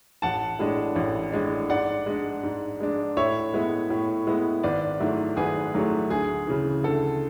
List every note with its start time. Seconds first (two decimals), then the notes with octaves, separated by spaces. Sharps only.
0.22 A1 F#5 A5
0.59 A2 G#3 D4
0.96 A1
1.32 A2 G#3 D4
1.70 G#2 D5 F#5
2.06 G#3 D4
2.43 G#2
2.80 G#3 D4
3.17 A2 C#5 E5
3.54 G#3 B3 E4
3.90 A2
4.27 G#3 B3 E4
4.63 G#1 B4 D5
5.00 G#2 F#3 A3 E4
5.36 G#1 G#4 B4
5.74 G#2 F#3 A3 E4
6.10 D2 G#4
6.47 C#3 E3
6.84 D2 A4